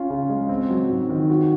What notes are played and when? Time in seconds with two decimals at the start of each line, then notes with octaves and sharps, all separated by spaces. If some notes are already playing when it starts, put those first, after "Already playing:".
Already playing: C#4 F4
0.10 C#3
0.30 G#3
0.49 C4
0.69 F#3
0.89 G#2
1.10 D#3
1.30 F#4